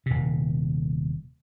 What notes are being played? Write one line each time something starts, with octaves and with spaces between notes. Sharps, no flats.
D#1 C3